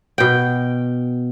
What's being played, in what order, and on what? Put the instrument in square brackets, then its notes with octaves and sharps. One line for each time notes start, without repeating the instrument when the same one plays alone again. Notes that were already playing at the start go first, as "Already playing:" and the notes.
[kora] B2 G5